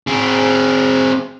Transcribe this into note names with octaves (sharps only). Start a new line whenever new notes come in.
C4 G#4